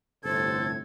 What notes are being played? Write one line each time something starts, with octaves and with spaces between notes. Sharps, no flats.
G1 A2 C3 A4 C5 G#6